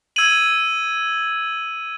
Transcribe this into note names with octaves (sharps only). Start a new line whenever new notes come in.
E6 G#6 D#7 F#7